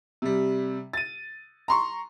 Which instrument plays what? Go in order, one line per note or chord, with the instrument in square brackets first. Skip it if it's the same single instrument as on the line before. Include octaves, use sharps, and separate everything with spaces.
[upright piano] C3 G3
A6 D#7
A#5 C6 C#6